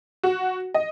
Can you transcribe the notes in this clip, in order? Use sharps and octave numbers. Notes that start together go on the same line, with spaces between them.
F#4
D#5